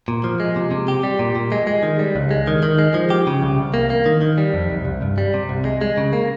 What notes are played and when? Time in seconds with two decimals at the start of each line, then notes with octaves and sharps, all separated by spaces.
0.08 A#2
0.24 F3
0.40 G#3
0.56 C3
0.71 C3
0.88 G4
1.03 G3
1.19 A#2
1.36 A#2
1.52 G#3
1.67 G#3
1.83 D#3
1.99 G3
2.16 C#2
2.31 G#3
2.47 D#3
2.63 D#3
2.79 G#3
2.94 F3
3.10 G4
3.27 C#3
3.42 C2
3.58 C2
3.74 A#3
3.90 A#3
4.06 D#3
4.21 D#3
4.38 G3
4.54 F2
4.70 C2
4.85 C2
5.02 G2
5.18 G3
5.34 C3
5.49 C2
5.65 G#3
5.81 G#3
5.98 C#3
6.13 A#3